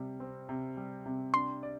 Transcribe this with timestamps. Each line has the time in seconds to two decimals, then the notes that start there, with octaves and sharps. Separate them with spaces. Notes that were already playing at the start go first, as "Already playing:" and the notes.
Already playing: C3 G3
0.20 C4
0.49 C3
0.77 G3
1.06 C3
1.34 D4 C6
1.63 D5